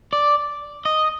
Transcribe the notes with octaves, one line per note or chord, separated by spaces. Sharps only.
D5
D#5